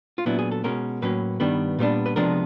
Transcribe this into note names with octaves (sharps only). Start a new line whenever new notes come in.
F4
A#2 F#3 B3 D4 E4
G#4
A4
B2 G#3 C#4 A#4
A2 F#3 A#3 C#4 B4
G2 D#3 G3 B3 D4
A#2 G3 B3 D4
B4
C3 F3 G#3 B3 D4 A#4